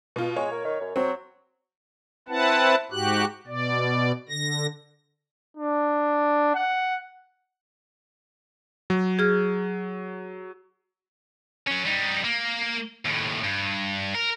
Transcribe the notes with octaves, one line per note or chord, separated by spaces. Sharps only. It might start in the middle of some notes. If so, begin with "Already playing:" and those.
B2 F4
G#3 C#5
A#3
D#3
F#2
F#3 C4
C4 E4 B4 F#5 A5
G#2 F#4 G4 F#6
B2 D5
D3 A#6
D4
F#5
F#3
G#4 F6
F#3 C#4
G3 D#4
A#3
D#2 A2
G2
A#4